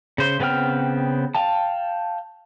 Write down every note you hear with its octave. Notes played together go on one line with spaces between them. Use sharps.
C#3 C5 C6
C#3 B3 C4 G5 F6
F5 G5 A5